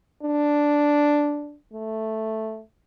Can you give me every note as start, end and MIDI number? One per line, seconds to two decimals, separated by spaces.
0.22 1.56 62
1.73 2.62 57